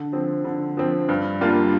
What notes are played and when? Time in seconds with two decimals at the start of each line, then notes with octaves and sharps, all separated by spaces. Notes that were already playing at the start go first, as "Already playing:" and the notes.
Already playing: D3
0.13 F3 C4
0.45 D3
0.77 F3 C4
1.09 G2
1.41 G3 A#3 D4 F4